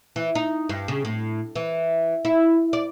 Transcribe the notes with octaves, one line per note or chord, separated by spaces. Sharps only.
E3
D#4
G2
C#3
A2
E3
E4
D5